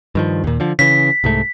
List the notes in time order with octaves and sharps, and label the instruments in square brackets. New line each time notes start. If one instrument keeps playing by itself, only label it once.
[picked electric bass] G2 D#3 F3
D#2 A#2
D3 F3
[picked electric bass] C#3 E3 [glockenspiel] B6
[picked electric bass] C2 G#2 A3